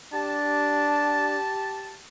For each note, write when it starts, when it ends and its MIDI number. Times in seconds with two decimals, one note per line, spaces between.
0.13 1.38 62
0.13 1.99 67
0.13 1.99 81